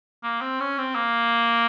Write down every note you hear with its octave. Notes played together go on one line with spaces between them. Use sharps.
A#3
C4
C#4
C4
A#3